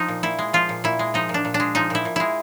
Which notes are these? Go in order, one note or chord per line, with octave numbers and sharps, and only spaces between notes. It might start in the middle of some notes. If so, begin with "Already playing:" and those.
Already playing: F3 D#4
A#2
A#2 E4
G#3
F3 F4
A#2
A#2 E4
G#3
F3 D#4
A#2
D4
A#2
D4
G#3
F3 D#4
A#2 E4
A#2
G#3 E4